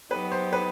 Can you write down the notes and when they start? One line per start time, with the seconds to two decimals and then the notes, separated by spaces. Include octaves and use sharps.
0.11 F#3 B3 D#4 G4 B4
0.32 C5
0.53 B4